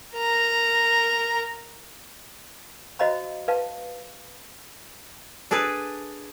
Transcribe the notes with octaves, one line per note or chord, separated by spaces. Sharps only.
A#4 A#5
F#4 C5 D#5 F5 A#5 B5
B4 F5 A5
D4 G#4 A4 B4